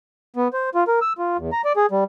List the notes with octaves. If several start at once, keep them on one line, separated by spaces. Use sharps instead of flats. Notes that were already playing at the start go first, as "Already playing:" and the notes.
B3
C5
F4
A#4
E6
F4
E2
A#5
D5
G#4
G3